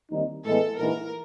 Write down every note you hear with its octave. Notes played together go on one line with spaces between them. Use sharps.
D#2 D#3 G3 C4 D#4
A2 E3 G#3 B3 A4
A#1 G#2 E3 A#4